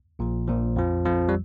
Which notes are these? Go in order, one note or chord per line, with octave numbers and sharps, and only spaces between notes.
A#1 A#2 F3
A#1 A#2 F3
F2 F3
F2 F3
G3